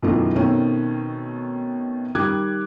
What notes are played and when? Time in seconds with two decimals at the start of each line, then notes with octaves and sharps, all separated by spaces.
0.02 B1 F#2 D#3 E3 A3 F4
0.36 B2 D#3 A3 C4 C#4
2.15 D#3 G3 D6 F#6 G#6